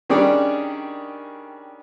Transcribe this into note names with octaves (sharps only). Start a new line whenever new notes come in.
D#3 G3 C#4 D4 G#4 D5